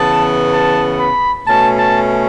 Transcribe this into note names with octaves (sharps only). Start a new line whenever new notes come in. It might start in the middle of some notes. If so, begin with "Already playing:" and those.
Already playing: C#3 E3 B3 A5
A5
B5
B2 A3 C#4 A5
A5